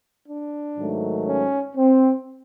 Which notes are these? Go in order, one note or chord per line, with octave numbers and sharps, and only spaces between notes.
D4
G#2 D#3 F#3 A3
C#4
C4